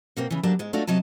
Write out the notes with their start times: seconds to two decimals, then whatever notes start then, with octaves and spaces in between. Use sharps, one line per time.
0.17 B2 A#3 C4
0.31 C#3 E3
0.43 D2 F#3 G3 A#3 D4 A5
0.59 G#2 G#3
0.73 F#3 A3 D4 D#4 F4 F#4
0.87 C3 F#3 D#5 A5